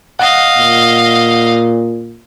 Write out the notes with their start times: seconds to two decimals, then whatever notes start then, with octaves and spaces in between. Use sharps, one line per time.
0.19 D#5 F5 F#5
0.58 A#2